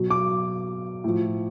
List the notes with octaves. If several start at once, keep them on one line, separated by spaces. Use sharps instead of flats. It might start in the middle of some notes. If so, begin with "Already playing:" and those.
Already playing: B2 F#3
D6
A2 F3